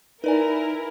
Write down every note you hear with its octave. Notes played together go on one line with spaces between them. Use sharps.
D#4 E4 A#4 B4 D5 G#5